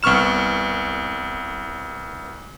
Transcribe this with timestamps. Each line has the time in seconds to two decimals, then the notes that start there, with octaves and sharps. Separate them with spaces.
0.03 C2 B3 C#6 F6 E7